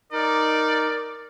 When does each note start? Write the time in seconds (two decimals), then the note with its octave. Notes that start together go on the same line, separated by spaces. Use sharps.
0.12 D#4 A#4 D5